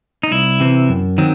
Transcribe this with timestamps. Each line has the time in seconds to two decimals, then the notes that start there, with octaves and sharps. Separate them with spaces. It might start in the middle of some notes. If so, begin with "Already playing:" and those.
0.23 D#4
0.31 C2 E4
0.60 C3 E3 C4
0.89 F#2
1.18 D#3 F#3 C4